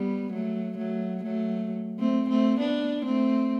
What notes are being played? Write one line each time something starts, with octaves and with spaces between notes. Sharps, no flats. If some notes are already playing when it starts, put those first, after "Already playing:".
Already playing: G3 B3
F#3 A3
F#3 A3
F#3 A3
A3 C4
A3 C4
B3 D4
A3 C4